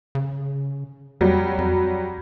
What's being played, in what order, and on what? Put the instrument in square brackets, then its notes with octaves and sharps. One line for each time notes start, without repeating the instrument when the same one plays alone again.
[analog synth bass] C#3
[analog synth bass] F2 [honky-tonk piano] F#3 G3
[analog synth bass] F2